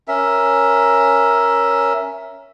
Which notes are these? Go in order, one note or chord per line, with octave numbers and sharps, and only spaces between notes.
C#4 A#4 E5